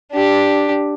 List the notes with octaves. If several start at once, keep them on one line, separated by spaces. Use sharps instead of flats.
D4 G4